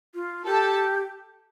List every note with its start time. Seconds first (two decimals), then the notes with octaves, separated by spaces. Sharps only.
0.15 F4
0.45 G4 A4 A5